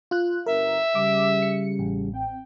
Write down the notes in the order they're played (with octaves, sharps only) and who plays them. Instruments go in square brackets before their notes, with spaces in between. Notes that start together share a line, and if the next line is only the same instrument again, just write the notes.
[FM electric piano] F4 F#6
[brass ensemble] G1 [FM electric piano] A#4 [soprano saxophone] E5
[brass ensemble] C#3 G3 [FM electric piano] D6
[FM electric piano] C#7
A1
[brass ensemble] C4 G5